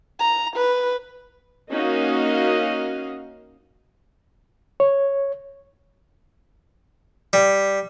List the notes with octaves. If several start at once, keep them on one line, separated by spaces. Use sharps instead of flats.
A#5
B4
A#3 C#4 D#4 F#4 D#5 F5
C#5
G3